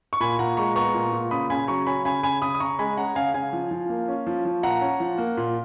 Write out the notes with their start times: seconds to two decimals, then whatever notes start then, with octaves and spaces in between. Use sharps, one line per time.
0.13 C#6
0.20 A#2 G#5 B5
0.39 A#2 F#5 A#5
0.57 G#3 A#5 C#6
0.76 B3 A#5 C#6
0.94 A#2
1.13 A#2
1.31 C#3 B5 D#6
1.50 C#3 G#5 B5
1.68 F#3 A#5 C#6
1.87 C#4 G#5 B5
2.05 C#3 G#5 B5
2.23 C#3 G#5 B5
2.42 C#3 B5 D#6
2.55 D#6
2.60 C#3 A#5 C#6
2.79 G#3 G#5 B5
2.97 C#4 F#5 A#5
3.15 C#3 F5 G#5
3.34 C#3 F5 G#5
3.53 F3
3.71 F3
3.89 A#3
4.08 C#4
4.27 F3
4.45 F3
4.63 A#2 F#5 A#5
4.81 C#4
5.00 F3
5.18 A#3
5.37 A#2